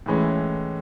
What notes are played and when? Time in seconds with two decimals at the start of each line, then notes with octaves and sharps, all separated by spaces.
0.06 A2 E3 G#3 C#4